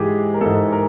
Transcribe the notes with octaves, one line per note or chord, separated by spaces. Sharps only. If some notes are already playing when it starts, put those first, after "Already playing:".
Already playing: G#2 E3 G#3 G4 G#4
A#4
G#2 E3 G#3 A4
A#4